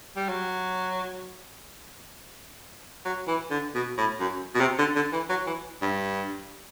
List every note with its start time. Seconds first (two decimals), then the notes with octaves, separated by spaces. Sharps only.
0.16 G3
0.29 F#3
3.05 F#3
3.27 E3
3.50 D3
3.75 B2
3.98 A2
4.20 F#2
4.55 B2
4.60 C3
4.78 D3
4.96 D3
5.13 E3
5.29 F#3
5.46 E3
5.82 G2